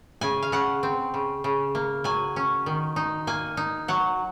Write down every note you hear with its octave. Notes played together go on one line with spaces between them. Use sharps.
C#3 G#5
F5
C#3 F#5
C4
C#3
C#3
A#3
F#3 G#5
C#4
D#3
D#4
A#3 G#5
D#4
F#3 F#5